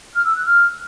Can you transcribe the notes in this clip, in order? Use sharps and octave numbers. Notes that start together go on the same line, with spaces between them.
F6
E6
F#6
F6